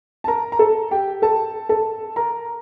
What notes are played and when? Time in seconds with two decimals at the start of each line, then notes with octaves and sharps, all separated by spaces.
0.24 A5
0.28 A#4 A#5
0.52 A#5
0.59 A4 A5
0.91 G4 G5
1.22 A4 A5
1.69 A4 A5
2.16 A#4 A#5